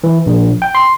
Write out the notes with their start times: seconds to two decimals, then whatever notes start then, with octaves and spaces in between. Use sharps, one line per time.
0.04 E3
0.26 A#1
0.62 G5
0.75 C6